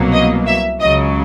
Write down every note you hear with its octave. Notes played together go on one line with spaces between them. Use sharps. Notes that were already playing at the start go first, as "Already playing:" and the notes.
Already playing: C2 B2 F#3 A#3
D#5
E5
C#2 C#3 F#3 D#5